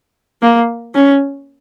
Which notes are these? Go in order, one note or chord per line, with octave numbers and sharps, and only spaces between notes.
A#3
C#4